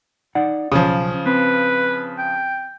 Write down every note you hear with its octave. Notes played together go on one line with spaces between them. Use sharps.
D#4 D5 F#5
B1 F#2 C#3 F3 C#4
C4 B4
G5